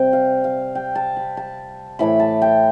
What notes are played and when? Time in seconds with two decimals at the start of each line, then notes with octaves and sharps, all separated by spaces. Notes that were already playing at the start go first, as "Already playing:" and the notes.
Already playing: C3 G3 G5
0.13 F5
0.44 F5
0.75 G5
0.95 A5
1.17 B5
1.37 A5
1.99 A2 E3 A3 B5
2.20 A5
2.42 G5